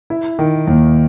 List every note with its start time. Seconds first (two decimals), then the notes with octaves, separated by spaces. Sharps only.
0.10 E4
0.39 D#3
0.67 D#2